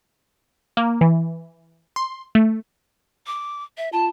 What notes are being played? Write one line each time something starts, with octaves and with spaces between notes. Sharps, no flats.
A#3
E3
C6
A3
D6
E5
F4 A5